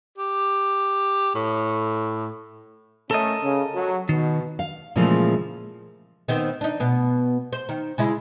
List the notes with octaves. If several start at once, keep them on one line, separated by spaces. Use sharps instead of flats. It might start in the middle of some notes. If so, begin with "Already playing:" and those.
G4
A2
A3 C#4 A4 A#4 D#5
C#3
F#3
B2 D#3
F5
A#2 C#3 E3 F3 G#3 A3
D#3 B3 C4
D4 D#4
B2 B3
C5
D#3
C#3 G#3 E4